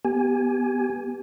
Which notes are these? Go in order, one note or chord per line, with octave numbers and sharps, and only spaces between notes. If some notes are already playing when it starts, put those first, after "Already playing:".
B3 G4 G#5